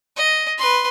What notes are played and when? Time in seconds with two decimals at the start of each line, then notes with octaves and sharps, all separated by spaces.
0.16 D#5
0.58 B4 C6